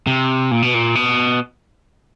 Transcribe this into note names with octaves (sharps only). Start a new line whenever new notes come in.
C3
A#2
B2
A#2
B2